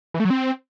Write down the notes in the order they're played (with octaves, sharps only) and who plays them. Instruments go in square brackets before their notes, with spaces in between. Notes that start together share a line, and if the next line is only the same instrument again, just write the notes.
[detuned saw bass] E3
A3
F#3
C4